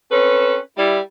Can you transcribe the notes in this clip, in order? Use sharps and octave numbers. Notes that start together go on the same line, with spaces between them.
C4 C#4 A4 B4
G3 E4